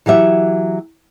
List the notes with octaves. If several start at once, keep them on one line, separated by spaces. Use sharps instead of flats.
E3 F#3 G4 E5 F#5